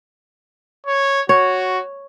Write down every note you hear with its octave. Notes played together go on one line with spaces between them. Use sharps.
C#5
F#4 C#5